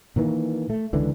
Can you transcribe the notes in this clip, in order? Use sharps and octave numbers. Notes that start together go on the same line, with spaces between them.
A#2 D#3 E3 A#3
A3
C#2 D3 E3